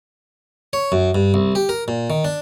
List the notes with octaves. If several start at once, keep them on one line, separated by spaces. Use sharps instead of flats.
C#5
F#2
G2
C2
G4
A#4
A#2
D#3
D4